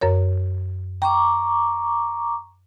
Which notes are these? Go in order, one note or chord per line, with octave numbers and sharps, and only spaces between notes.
F#2 A#4 C#5
G5 A#5 C#6 D6